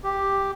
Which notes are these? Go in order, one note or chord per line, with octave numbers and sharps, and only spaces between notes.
G4